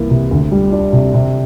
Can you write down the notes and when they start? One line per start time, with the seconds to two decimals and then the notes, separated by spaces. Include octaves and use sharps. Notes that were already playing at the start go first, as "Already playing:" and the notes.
Already playing: C2 E3 A#3
0.10 C3
0.31 D2
0.52 G3
0.72 D4
0.93 C3
1.14 C3